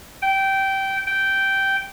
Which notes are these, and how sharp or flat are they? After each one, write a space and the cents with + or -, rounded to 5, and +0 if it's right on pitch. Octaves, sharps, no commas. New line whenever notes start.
G5 -15
G5 -10